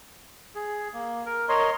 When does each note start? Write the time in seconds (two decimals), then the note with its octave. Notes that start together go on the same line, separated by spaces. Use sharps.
0.55 G#4
0.94 A#3
1.26 A#4
1.49 A#4 C#5 D#5 C6